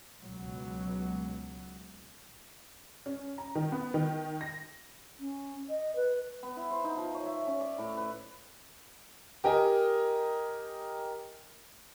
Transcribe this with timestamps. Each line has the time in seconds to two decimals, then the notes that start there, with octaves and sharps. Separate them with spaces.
0.22 C#2 B2 F#3
3.06 C#4
3.38 A#5
3.55 D#3
3.72 B3
3.94 D#3
4.41 A#6
5.19 C#4
5.69 D#5
5.95 B4
6.43 B3
6.56 E4
6.70 C5
6.84 D#4
6.97 F3
7.14 C#5
7.26 E5
7.47 C#4
7.61 D5
7.78 A2
7.97 B4
9.44 G4 A#4 D#5 G#5